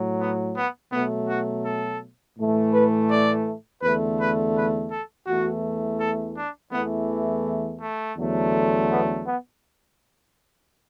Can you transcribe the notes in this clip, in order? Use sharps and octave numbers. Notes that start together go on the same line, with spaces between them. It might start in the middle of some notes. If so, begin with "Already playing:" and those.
Already playing: A2 F#3
B3
B3
B2 F#3 A3 B3
F#4
A4
A2 E3 A3
B4
D5
E2 D3 A3 B4
B4
B4
A4
E2 E3 A3 F#4
A4
D4
E2 E3 A3 B3
A3
E2 D3 F#3 A3
B3
B3